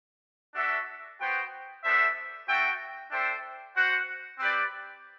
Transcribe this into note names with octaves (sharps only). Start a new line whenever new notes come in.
D4 F#4 A4 E5
B3 F#4 C5 G5
B3 D4 A4 C5 E5
C4 F#4 A4 E5 G5
D4 A4 C5 E5 G5
F#4 C5 F#5
C4 G4 B4 D5